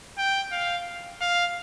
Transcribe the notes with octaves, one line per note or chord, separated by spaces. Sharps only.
G5
F5
F5